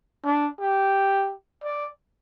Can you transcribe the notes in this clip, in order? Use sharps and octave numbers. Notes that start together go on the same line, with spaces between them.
D4
G4
D5